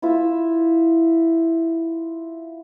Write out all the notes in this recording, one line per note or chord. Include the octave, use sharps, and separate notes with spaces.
E4 F4 E5